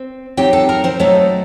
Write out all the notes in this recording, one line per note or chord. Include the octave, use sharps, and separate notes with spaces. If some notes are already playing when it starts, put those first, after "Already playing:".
Already playing: C4
F#3 C4 D#4 G4 G5
A4 A5
A#4 A#5
C4 C5
F#3 A3 C4 D#4 A4